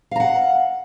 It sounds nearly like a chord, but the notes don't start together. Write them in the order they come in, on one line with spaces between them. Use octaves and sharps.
F5 A#5 F#5